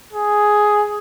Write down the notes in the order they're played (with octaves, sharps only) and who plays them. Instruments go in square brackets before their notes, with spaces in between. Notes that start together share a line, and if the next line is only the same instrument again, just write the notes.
[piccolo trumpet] G#4